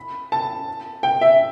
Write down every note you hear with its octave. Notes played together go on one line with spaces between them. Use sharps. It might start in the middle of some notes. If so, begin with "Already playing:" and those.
Already playing: B5
A5
G5
E5